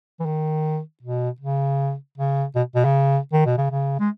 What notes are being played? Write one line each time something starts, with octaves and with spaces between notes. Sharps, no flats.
E3
D#3
B2
C#3
C#3
B2
B2
C#3
D#3
B2
C#3
C#3
G#3